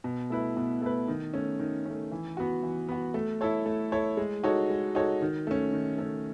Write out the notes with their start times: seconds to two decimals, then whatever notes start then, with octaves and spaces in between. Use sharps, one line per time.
0.04 B2
0.30 A3 E4 B4
0.56 B2
0.82 A3 E4 B4
1.08 D#3
1.34 A3 C#4
1.59 D#3
1.85 A3 C#4
2.12 E3
2.37 B3 F#4
2.63 E3
2.89 B3 F#4
3.14 A3
3.41 E4 A4 C#5
3.66 A3
3.92 E4 A4 C#5
4.17 G#3
4.43 D#4 F#4 A4 C#5
4.70 G#3
4.95 D#4 F#4 A4 C#5
5.22 D#3
5.47 A3 C#4
5.73 D#3
5.98 A3 C#4